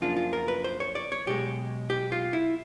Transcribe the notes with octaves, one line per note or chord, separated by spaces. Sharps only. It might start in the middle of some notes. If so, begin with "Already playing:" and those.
F#2 C#3 F3 A#3 D4 F4
F4
A#4
B4
C5
C#5
D5
C#5
B1 B2 G#3 G4
G4
F4
E4